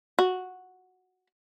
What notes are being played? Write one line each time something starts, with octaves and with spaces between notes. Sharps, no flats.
F#4